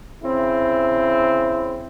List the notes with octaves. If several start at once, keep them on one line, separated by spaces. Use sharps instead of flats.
C#3 C4 E4